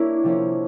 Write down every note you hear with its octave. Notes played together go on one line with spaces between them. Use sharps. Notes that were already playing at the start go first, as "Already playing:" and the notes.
Already playing: A#3 C#4 D4 E4
C3 F3 A#3 C#4